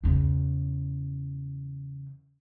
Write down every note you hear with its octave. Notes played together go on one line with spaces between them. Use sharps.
E2 C#3